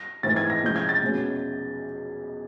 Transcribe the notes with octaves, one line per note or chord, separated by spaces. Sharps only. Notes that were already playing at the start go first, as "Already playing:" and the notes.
Already playing: A#6
G#2 E3 A3 C4 A6
G#6
A#6
C3 F3 G#3 C#4 E4 G6
G#6
A6
B2 G#3 C#4